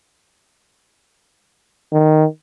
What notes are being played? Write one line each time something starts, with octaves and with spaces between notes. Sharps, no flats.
D#3